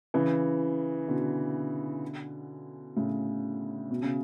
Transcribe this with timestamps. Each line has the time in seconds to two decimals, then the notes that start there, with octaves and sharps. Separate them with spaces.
0.14 C#3 E3
1.08 B2 D3
2.96 A2 C#3
3.90 B2
4.03 C#3